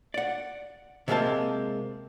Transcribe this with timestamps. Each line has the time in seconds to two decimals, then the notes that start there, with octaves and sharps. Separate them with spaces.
0.14 D5 F#5
1.08 C3 F#3 G#3 A#3 C4 A5